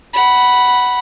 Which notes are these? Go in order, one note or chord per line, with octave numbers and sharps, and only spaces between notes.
F#5 B5